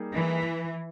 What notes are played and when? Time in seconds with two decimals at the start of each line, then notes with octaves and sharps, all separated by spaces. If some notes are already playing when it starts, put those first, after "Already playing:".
Already playing: G3 A#3 D#4 G#4
0.12 E3